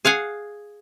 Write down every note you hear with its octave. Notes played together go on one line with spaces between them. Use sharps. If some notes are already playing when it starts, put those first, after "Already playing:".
G#4 F5 F#5 G#5